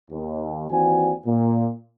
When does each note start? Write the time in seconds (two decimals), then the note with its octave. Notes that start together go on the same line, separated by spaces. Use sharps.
0.11 D#2
0.71 D#2 E3 C4 F#4 D5 G#5
1.26 A#2